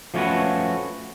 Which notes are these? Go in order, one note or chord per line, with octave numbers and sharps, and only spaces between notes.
F3 A3 C#4 F4 F#4 B4